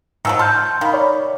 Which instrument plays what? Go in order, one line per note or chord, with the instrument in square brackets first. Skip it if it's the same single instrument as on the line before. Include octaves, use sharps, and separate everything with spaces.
[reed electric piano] G#2 E6 [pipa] D#3 F3 F#3
[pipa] A5 [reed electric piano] C6 F6 G6
[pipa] D#3 [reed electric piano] F5 B5
[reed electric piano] C#5 D5